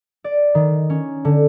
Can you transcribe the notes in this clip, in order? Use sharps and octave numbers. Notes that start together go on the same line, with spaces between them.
D5
D#3
C#4
D3